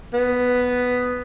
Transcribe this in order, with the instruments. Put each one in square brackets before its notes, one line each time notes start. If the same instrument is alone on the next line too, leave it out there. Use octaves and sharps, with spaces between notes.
[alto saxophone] B3